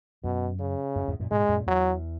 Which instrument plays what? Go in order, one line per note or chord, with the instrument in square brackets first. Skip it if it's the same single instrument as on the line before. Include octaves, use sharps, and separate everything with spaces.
[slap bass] F#2 [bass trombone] B2
[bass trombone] C#3
[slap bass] F#2
E2 G#2
F#2 A#2
[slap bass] G#2 B2 [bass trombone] G#3
[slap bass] F#2 A#2
[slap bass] E2 [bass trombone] F#3